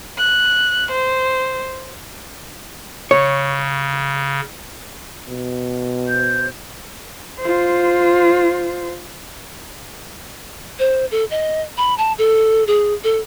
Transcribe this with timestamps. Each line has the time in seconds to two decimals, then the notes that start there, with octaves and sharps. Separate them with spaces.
0.18 F#6
0.92 C5
3.11 C#3 C#5
5.28 B2
6.08 C5 G6
7.41 F4 C5
10.79 C5
11.11 A4
11.31 D#5
11.77 B5
11.98 A5
12.18 A4
12.67 G#4
13.04 A4